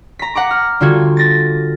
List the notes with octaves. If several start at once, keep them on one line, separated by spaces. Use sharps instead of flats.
A#5 B6
F#5 A#5 D6
F6
D3 G3 F4 F#4 G#6
A6 A#6